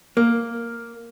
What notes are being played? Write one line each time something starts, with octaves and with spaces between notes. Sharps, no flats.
A#3